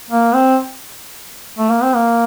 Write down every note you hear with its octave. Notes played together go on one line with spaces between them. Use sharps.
A#3
C4
A3
A#3
C4
A#3